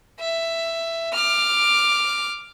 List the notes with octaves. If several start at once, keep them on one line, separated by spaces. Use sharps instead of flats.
E5
D6 F6